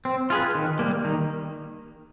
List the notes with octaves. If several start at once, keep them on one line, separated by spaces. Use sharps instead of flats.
C4
F4 G#4 B4
D#3
G3 A#3
D#3